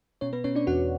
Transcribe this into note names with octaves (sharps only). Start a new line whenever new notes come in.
B2 C#4 C#5
B3 B4
B2 C#4 C#5
D4 D5
E2 F#4 F#5